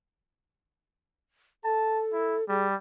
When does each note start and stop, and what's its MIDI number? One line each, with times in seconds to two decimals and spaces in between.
1.64 2.47 69
1.64 2.00 81
2.13 2.36 64
2.48 2.75 55
2.48 2.68 68